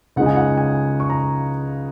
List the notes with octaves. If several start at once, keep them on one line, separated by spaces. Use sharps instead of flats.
C#2 C#3 G#3 D#4 F#5
G#5
F#5
G#5
C#6
A#5